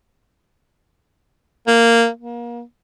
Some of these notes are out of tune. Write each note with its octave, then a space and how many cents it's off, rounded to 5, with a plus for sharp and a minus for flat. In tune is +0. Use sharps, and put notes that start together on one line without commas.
A#3 -10
A#3 +30